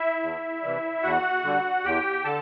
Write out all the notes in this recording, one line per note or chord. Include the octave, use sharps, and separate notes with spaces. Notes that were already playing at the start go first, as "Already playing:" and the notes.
Already playing: E4 E5
E2
C3 E3 G3
E2 F#4 F#5
D3 G3
E2 G4 G5
D3 A4 A5